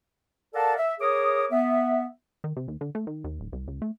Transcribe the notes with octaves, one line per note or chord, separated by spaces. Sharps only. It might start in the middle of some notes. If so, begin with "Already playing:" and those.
A4 A#4 D5 F5 F#5 A5
E5
G#4 A#4 C#5 D6 D#6
B3 E5
D#3
C3
D#2
D3
A3
D#3
D#2
D1
C2
C#2
A3